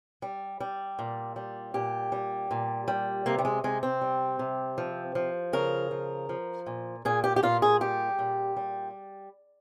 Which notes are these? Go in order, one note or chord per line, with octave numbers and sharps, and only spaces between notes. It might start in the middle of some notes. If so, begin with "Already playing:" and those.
G3
G3
A#2
G3
A#2 G4
G3
A#2
G3
C3 A#3
G3
G#3
C3 G#3
C4
G3
C3
F3
F3
C#3 A#4
F3
F3
A#2
A#2 G#4
G4
G4
A#2 F4
G#4
G3 G4
A#2
G3